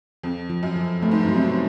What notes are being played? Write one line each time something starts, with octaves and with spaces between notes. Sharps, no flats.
F2 F3
F3
F#2
F3
G2 A3
G#2
G2
F#3
C3
B2